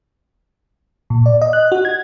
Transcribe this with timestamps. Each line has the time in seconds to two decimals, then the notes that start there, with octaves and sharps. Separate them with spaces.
1.10 A#2
1.26 D5
1.42 D#5
1.53 F#6
1.72 F#4
1.85 G#6